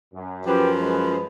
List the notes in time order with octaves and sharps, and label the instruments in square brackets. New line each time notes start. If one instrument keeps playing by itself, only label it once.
[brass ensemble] F#2
[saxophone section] F#2 F3 [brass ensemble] G4 B4
[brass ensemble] G#3 B4